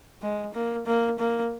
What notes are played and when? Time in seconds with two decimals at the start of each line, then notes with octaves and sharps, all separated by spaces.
0.22 G#3
0.53 A#3
0.86 A#3
1.19 A#3